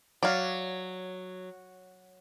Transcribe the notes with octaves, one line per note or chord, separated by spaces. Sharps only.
F#3 D5 F5